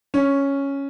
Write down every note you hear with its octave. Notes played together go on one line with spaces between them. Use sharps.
C#4